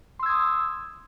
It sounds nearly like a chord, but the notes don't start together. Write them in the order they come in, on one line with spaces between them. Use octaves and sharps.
C6 E6 G#6 D#6